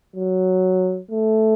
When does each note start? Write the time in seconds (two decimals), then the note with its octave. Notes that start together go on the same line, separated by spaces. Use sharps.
0.16 F#3
1.11 A3